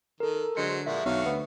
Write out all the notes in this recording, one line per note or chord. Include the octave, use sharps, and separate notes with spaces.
D#3 A4 A#4
D3 F#3 G#3 C5 C#7
A#2 F3 G#3 F#4 E5
B1 D3 F#3 F#4 F5
D2 B3